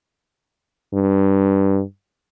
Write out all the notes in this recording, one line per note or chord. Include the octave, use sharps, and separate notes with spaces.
G2